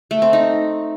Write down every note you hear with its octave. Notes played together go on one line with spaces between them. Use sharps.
A3
C4
D#4